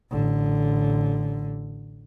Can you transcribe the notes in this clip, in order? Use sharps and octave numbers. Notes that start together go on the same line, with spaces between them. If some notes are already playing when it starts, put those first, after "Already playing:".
A1 D3